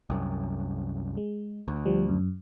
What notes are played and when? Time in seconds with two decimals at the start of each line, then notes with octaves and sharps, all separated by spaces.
0.10 C2 F#2
1.17 G#3
1.68 D2
1.86 F3 G3
2.09 F#2